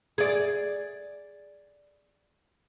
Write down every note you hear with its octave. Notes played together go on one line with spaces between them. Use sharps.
G#4 D5